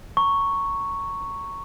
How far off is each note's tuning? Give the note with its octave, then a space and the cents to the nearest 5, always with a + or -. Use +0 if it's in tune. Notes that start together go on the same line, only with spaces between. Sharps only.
A#5 -20 C#6 +0